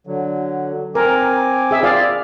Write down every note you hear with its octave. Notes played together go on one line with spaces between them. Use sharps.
D3 F#3
C4 A#4 G#5 D6
G#4 E5
F4 D5 F5